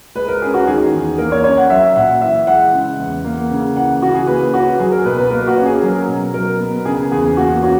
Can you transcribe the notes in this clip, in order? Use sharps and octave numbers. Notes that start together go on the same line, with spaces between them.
G#3 B4
A#4
C#4 G#4
F#4
D#3 G#4
E2
A#3 A#4
C#5
C#4 C#5
F#5
F#3 E5
A#2 F#5
E3 E5
G#3 F#5
C#3
E2
A#3
C#3
E3 F#5
C#3 F#4
G#4
A#3 B4
C#4 F#4
F#3 G#4
A#4
B2 B4
B4
A#3 A#4
F#4
C#4
G#4
F#3 A#4
B2
F#3 A#4
B3
C#3 G#4
E2 G#4
A#3 F#4
C#4 F#4